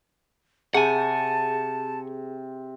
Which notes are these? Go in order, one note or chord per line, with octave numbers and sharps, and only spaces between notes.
C3 G#4 F#5 G#5 A5